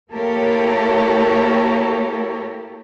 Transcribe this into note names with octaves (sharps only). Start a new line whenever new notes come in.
A#3 E4 G4 A4 A#4 C#5